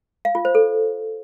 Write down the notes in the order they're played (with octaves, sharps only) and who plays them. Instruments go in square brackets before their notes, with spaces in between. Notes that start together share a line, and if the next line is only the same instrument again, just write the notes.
[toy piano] F5
F4
C5
A4